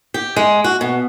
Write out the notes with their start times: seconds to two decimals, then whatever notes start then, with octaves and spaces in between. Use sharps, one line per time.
0.14 G4
0.36 G#3
0.64 F#4
0.81 B2